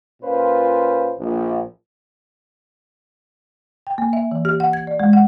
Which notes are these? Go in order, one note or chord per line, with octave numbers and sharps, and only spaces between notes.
A#2 C#4 F4 B4 C5
A#1
G5
A#3
E5
E3
G4
F#5
G#6
D5
G#3
F#5